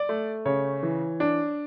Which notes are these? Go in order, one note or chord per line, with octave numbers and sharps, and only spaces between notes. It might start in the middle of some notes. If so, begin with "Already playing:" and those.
Already playing: D5
A3
C#3 C#5
E3
D4